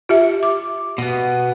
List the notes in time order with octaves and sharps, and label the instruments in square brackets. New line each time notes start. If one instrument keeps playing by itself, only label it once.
[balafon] F4 G4 E5
D6
[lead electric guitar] B2 B3